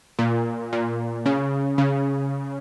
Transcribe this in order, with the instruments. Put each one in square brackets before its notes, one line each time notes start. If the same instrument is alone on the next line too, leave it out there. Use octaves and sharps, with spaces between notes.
[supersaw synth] A#2
A#2
C#3
C#3